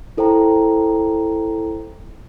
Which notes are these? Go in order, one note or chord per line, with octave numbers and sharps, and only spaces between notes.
E4 A4 C5 G5 A#5